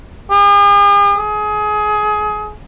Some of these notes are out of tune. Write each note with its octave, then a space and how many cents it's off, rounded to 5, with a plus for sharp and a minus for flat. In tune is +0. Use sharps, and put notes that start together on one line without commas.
G#4 -45
G#4 +25